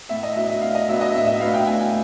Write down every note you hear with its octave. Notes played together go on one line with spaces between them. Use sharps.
A2 E5
D#5
F#3 B3 D4 E5
E5
A2 F5
D#5
F#3 B3 D4 E5
D#5
A2 E5
E5
F#3 B3 D4 F5
G5
A2 G#5